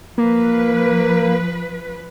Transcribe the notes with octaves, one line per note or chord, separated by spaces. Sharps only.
F3 A#3 B4